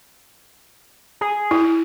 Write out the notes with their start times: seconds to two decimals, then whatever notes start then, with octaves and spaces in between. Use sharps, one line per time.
1.21 G#4
1.51 E4